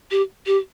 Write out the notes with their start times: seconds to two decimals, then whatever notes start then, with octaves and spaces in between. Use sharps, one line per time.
0.11 G4
0.46 G4